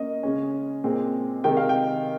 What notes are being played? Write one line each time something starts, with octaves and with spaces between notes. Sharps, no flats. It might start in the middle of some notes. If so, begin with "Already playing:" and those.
Already playing: A#3 C#4 D#5
C#3 G#3 C#4
A#2 G#3 C4
C3 D#3 G#3 G5
F5
G5